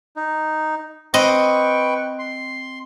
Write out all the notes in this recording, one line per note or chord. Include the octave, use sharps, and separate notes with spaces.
D#4
C4 B4 D#5 G5 C#6
C6